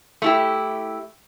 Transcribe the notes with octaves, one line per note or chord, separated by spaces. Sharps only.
A3 E4 G4